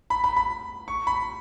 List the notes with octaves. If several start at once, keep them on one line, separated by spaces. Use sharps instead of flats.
B5
B5
B5
C#6
B5